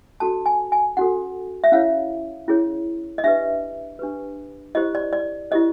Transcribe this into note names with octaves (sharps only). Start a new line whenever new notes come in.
C#4 F#4 A4 A5
G#5
G#5
C#4 F#4 A4 F#5
E5
C#4 E4 G#4 C#5 F5
C#4 E4 G#4 C#5
D#5
D4 G4 B4 E5
D4 G4 B4
E4 G4 C5 D#5
D5
D5
E4 G4 C5 D#5